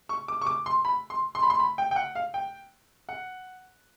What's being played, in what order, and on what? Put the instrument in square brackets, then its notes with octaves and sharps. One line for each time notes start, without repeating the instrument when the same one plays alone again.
[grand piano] C#6
D6
C#6
D6
C6
B5
C6
C6
B5
C6
B5
G5
G5
F#5
F5
G5
F#5